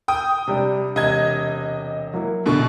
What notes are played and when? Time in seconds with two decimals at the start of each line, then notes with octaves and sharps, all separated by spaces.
0.08 G5 D#6
0.47 C3 G3 D4
0.96 E1 C3 D#5 G#6
2.14 F#3 A#3 E4
2.46 A#1 B2 D3 C#6